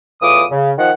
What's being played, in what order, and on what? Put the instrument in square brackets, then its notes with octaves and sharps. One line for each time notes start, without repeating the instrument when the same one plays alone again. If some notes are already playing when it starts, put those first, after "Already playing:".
[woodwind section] E2 A2 E3 F4 D6 D#6
C#3
D#3 F3 F#5